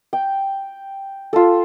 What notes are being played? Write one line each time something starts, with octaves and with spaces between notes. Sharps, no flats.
G5
F4 A4